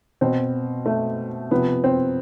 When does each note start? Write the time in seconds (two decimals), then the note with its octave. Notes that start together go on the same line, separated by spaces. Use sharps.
0.21 B2 C4
0.86 A3
1.51 C3 F3 B3
1.84 C4